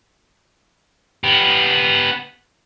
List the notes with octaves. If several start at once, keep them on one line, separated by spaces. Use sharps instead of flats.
B3 G4